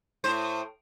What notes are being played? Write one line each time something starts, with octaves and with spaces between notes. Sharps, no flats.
A2 C5